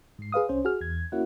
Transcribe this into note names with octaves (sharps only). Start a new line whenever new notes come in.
G#2 C7
G#4 B4 F5 D#6
C2 C#4 C5
F#4 G#4 F6
E2 G#6
A#3 C#4 E4 F#4 F#5